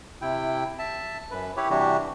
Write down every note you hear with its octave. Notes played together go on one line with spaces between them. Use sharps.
C3 E4 G5
E5 A5
F#2 B4
E4 G4 B4 C#5
C3 E3 G3 D4 F#4 G4